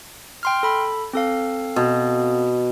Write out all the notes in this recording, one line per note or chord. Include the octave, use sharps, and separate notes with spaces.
G5 C6 F6
A4 B5
C4 A4 F5
B2